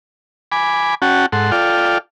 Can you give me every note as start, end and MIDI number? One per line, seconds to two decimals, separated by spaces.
0.52 0.95 80
0.52 0.95 83
0.52 0.95 86
1.02 1.26 61
1.02 1.26 66
1.02 1.26 78
1.02 1.26 79
1.02 1.26 81
1.32 1.51 44
1.32 1.51 69
1.32 1.51 78
1.32 1.51 84
1.52 1.98 65
1.52 1.98 69
1.52 1.98 74
1.52 1.98 77
1.52 1.98 79